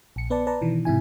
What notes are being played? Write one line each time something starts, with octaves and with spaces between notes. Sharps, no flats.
A#1 C#7
B3 B4 D5 A5
B4 D5 A5 A#5
B2 D#3 E3
G#2 C3 E4 G#5